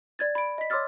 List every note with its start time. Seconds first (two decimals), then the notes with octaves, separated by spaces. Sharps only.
0.19 D5 G#6 A6
0.35 B5 D7
0.58 D#5 B6
0.70 C#5 C6 D6 E6 F6 A6